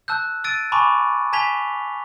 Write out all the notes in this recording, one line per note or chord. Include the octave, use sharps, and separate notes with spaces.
A5 E6 F#6 G6
E6 A6 D7 D#7
G#5 A5 B5 C#6 D6
G#5 A5 G#6 B6 F7 G7